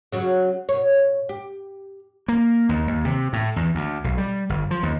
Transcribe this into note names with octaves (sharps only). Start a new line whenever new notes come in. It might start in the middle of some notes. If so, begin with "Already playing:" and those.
C#3 F#3 F#4
B2 C#5
G4
A#3
D#2
D#2
C3
A2
E2
D2
B1
G3
G1
F3
D#2